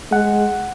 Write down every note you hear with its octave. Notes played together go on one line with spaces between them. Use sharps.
G#3 F#5